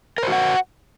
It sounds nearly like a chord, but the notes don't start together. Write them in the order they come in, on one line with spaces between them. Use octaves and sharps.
A#4 C5 F#4 F#5